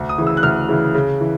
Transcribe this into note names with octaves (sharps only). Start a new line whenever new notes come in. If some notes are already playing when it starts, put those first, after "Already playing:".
Already playing: D2
D#6
C#3 E3
E6
F#6
D2 F6
C#3 E3
C#3
E3